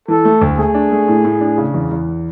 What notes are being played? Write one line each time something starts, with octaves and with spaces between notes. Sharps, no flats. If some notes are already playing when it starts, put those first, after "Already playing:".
E3 A4
A3
D2
A3 G#4
D4
A3
A2
A2
D4
C#3
E2
E2